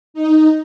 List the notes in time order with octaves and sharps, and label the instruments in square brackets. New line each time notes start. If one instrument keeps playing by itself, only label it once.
[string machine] D#4